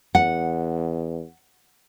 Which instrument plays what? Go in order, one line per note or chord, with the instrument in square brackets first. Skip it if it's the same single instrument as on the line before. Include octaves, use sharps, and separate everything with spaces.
[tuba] E2 [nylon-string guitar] F#5